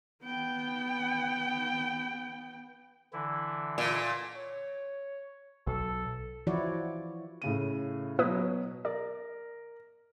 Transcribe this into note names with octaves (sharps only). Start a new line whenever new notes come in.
B3 G5
D3 E3 E4
A#2
C#5
B1 A4
E3 F3 E4 F#4 C#5 D5
A2 C#3 D#7
B2 F#3 E4 B4 D#6
A#4 D5